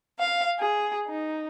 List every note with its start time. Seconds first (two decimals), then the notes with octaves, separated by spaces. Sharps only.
0.19 F5
0.58 G#4
1.06 D#4